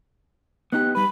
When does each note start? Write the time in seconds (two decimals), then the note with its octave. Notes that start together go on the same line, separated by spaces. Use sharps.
0.73 B3 D#4 G4 F#6
0.95 G3 B4 B5